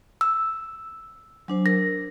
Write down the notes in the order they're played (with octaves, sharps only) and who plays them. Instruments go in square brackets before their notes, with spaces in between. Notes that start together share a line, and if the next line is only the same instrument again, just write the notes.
[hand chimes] E6
[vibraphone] F#3 D4 C5
[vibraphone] A#4 [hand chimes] A#6